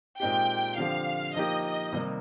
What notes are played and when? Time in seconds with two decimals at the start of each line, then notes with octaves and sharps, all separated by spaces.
0.20 A#2 G#3 C4 D#4 G4 G5
0.78 D3 F3 C4 G4 F5
1.34 F3 A#3 D#4 G4 D#5
1.64 D#5
1.93 C3 D#3 G3 A#3 D#4